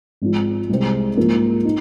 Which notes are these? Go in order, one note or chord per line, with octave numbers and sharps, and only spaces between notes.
G#1 G#2 F3
C2 C3 G#3 C4
G#2 F3 A#3
D#4